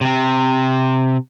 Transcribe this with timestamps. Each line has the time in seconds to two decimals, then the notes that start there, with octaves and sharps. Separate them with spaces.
0.01 C3 C4